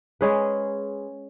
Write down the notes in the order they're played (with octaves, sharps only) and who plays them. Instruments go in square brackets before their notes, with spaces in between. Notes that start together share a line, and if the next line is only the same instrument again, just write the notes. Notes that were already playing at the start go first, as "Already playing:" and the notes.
[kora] G#3 C#4 G#4 B4